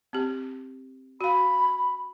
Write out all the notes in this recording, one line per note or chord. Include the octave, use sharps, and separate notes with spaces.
C4 G4
F#4 F5 B5